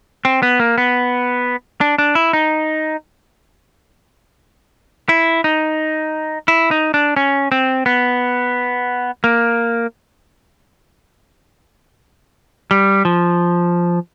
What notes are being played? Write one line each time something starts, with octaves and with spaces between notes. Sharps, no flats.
C4
B3
A#3
B3
D4
D4
E4
D#4
E4
D#4
E4
D#4
D4
C#4
C4
B3
A#3
G3
F3